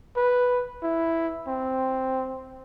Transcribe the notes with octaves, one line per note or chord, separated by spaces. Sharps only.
B4
E4
C4